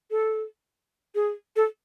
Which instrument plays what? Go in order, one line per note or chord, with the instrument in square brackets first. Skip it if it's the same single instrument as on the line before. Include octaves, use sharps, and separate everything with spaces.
[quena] A4
G#4
A4